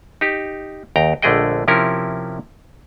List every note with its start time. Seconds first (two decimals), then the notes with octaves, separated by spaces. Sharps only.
0.21 D#4 G4
0.96 D#2 G5 A#5
1.22 A#1 D3 A3 G#4 D#5 G5
1.68 C3 F3 C#4 E4 A#4